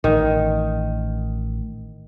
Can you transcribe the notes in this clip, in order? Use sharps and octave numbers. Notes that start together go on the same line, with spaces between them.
A1 D#3